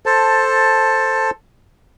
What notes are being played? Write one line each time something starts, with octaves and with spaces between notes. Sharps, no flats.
A4 C5 A5